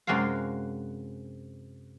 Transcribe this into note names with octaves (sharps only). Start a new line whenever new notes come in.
F#2 C3 G#3 F#4 D5 F5